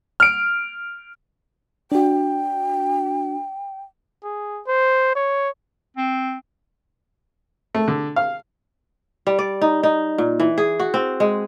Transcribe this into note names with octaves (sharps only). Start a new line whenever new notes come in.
F6 D7
D4 F#4 G5
G#4
C5
C#5
C4
A3
D3
F5
G3
D5
D#4
D#4
A#2
E3
G#4
F#4
C4
G#3